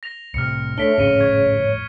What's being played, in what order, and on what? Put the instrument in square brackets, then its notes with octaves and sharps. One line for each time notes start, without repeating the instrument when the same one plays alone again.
[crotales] A#6 F7
[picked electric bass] C2 A2 C3 [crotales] F6 C#7
[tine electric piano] A3 D4 [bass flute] C#5 [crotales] B6 D7 G7
[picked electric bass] G#1 F2 A2 [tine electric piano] C#3 [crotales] C#7 D#7 G7
[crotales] C#6 G#6